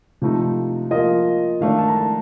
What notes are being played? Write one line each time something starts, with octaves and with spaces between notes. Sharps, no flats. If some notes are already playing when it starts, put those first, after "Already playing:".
C3 F3 A3 D#4
F3 A#3 F4 D#5
D#3 A3 D4 F5
A5
A#5
A5